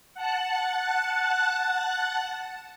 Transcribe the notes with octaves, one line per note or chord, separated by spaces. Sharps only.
F#5 A5 F#6